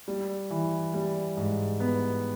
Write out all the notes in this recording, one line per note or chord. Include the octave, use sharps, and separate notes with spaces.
G3
E3
G3
G#2
B3